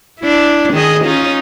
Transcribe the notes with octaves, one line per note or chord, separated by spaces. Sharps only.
D4 E4
D#3 G#4 D#5
C#4 D#4 F4